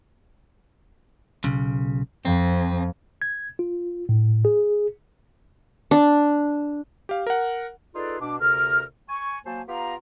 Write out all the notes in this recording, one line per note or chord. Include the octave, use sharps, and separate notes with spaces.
B1 C#3
F2 C4
G#6
F4
A2
G#4
D4
G4 F5
A#4 F#5
D#4 F4 G#4 A4 B4 D5
B2 D4 D6
D2 C3 A#4 F6
G#5 C#6
F#3 A#3 C5 G#5 A5
B3 F4 G4 F5 A#5